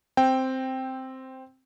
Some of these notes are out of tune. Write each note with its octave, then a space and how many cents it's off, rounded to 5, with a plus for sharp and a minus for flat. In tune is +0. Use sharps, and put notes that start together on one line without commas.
C4 +0 G5 +0